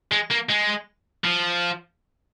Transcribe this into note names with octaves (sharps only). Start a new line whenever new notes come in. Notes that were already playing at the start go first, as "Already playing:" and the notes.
G#3
A#3
G#3
F3